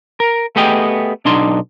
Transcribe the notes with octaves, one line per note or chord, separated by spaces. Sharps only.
A#4
A3 B3 G4 G#4 D#5 G5
B1 D4 D#4 C6